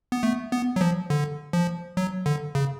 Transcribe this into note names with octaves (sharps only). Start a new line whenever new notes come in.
B3
A3
B3
F#3
F3
D3
F3
F#3
D3
C#3